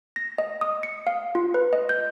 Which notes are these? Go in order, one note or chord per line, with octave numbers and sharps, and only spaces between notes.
A#6
D#5
D#6
C#7
F5
F4
B4
D#5
G6